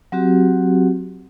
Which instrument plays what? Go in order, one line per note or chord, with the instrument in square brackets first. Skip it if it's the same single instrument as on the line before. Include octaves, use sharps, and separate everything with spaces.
[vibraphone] F#3 C4 F#4 G4